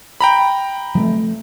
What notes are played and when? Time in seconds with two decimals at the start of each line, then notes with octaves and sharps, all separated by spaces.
0.21 G5 A#5 B5
0.95 F3 G#3 A3